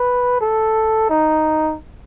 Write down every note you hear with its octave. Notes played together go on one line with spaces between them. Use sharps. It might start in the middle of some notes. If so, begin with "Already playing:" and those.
Already playing: B4
A4
D#4